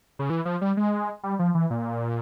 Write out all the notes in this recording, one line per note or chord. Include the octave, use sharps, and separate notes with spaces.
C#3
E3
F3
G3
G#3
G3
F3
E3
A#2